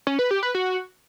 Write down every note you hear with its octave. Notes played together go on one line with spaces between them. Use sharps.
C#4
B4
G4
B4
F#4